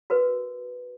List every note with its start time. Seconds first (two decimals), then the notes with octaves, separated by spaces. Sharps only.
0.10 F#4 A#4 B4